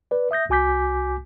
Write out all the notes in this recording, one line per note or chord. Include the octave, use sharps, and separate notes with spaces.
B4 D5
E5 D#6 G6 A#6
C2 F#4 G#5 D6 G6 B6